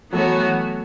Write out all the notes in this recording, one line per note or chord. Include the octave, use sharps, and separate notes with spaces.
E3 F#3 A3 B3 F#4 C#5